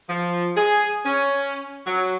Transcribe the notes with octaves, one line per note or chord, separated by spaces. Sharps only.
F3
G#4
C#4
F#3